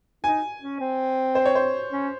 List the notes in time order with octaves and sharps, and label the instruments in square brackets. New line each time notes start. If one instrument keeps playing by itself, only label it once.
[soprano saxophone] D#4 [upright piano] G#5
[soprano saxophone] C#4
C4
[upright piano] C5
C#5
C5
[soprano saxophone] C#4